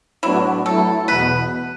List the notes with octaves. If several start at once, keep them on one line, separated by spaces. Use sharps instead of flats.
A2 F#3 B3 D4 E4 F#4
F#3 A3 E4 A4
E2 B2 B3 B4